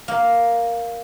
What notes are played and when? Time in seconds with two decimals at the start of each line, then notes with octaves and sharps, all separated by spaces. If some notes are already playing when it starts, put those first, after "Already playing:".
0.08 A#3